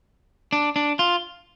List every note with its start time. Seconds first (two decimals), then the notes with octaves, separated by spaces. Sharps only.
0.52 D4
0.76 D4
0.99 F4